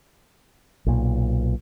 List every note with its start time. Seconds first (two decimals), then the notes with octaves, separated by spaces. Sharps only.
0.86 B1 A#2